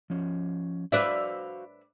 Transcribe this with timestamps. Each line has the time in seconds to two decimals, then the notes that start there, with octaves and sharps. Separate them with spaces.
0.10 F3 C#4
0.92 F#4 B4 C5 D5 E5 F5